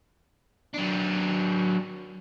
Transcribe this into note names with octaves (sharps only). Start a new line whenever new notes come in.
F#3 D4